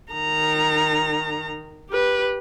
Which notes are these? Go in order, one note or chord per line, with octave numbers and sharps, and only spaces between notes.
D#3 A#5
G4 B4